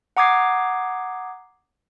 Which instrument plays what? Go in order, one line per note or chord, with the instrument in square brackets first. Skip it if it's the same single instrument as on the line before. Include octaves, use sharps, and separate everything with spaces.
[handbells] F#5 A#5 D6 D#6 G#6 C7